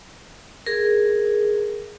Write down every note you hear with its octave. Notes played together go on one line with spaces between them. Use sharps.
G#4 A#4